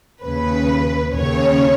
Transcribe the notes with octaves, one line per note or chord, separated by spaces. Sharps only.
D#2 C#3 B4
D#2 C#3 C#5